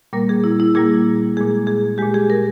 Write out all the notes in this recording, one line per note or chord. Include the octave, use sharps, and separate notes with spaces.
A#2 G3 A#3 A#4
G#4
E4
E4
A#2 G3 A#3 G#4
A#2 G#3 G#4
G#4
A#2 G#3 G4
G#4
A#4